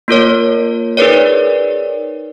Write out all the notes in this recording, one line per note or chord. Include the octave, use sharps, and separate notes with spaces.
A#3 F4 A#4 C#5
D#4 G#4 A#4 B4 C#5 D5